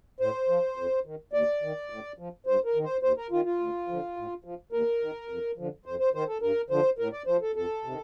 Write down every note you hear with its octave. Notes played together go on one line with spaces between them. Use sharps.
A2 C5
F3
F2
D#3
D#2 D5
D#3
A2
F3
G2 C5
A#4
D#3
C5
D#2 C5
A#4
D#3 F4
F4
D2
D3 F3
A2
F3
D#2 A#4
D#3
F2
D3 F3
F2 C5
C5
D#3 C5
A4
G2 A#4
D3 F3 C5
A2 A#4
D5
F3 C5
A4
F2 A4
C3 D#3